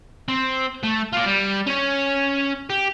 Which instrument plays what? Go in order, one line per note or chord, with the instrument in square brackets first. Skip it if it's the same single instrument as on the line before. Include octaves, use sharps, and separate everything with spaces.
[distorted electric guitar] C4
A3
F4 D5
G3
C#4 C#5
G4